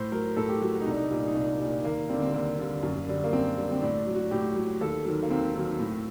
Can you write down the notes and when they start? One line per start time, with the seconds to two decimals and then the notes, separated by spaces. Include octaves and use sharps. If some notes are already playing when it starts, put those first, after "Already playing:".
Already playing: A2 C5
0.12 F#3 A#4
0.37 A2 A4
0.49 G4
0.61 F#3 F#4
0.73 F#4
0.81 D#4
0.86 C2 D4
0.96 D#4
1.10 A#2 G3
1.27 D#4
1.35 C2 D4
1.60 A#2 G3
1.84 D#2 A#3
2.09 G3 C4
2.14 D3
2.22 C4
2.34 D#2 A#3
2.59 D3 G3
2.83 F#2
3.08 D3 G3
3.24 A#3
3.33 F#2 C4
3.57 D3 G3
3.72 C4
3.82 A2 D4
3.99 D4
4.07 F#3
4.14 F#4
4.31 A2 G4
4.56 F#3
4.81 D#2 A4
5.05 D#3 F#3
5.23 A#3
5.30 D#2 C4
5.55 D#3 F#3
5.79 A2